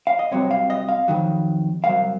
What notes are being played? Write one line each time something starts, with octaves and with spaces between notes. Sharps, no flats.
F5
D#5
C2 C3 F#3 C#5
F5
D#5
F5
F2 D#3 F#3
C2 C3 F#3 F5